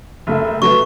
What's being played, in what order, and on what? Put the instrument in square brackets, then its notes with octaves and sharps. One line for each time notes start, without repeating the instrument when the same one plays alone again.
[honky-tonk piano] F#1 A3 E5
[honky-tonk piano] F#3 A3 B4 [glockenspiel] C#6